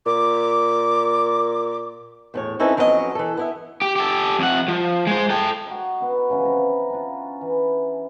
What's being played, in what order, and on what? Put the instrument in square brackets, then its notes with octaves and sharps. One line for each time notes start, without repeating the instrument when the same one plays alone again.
[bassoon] A#2 [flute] D6
[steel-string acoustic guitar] E2 A2 C#5
C4 C#4 D#4 E4 A4 B4
F2 F#3 B3 C#4 F4 D#5
E3 A4
B3 E4 E5
[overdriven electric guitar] G4
G4 A4
F2 F#5
F3
G#3 C5
A4 G5
[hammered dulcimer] D#4 F#4
B3 D4 D#4
C#3 E3 F3 C#4
B3 C4 A#5
C#4 D4 F4
E3